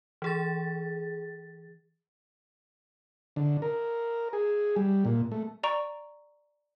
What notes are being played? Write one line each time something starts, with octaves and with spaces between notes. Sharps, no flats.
E3 G#4 A6
D3
A#4
G#4
G3
A#2
A3
D5 A#5 C#6 D7